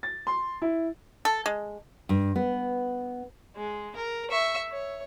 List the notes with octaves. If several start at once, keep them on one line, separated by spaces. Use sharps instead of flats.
A6
C6
E4
A4
G#3
G2
B3
G#3
A#4
E5 C#6
C#5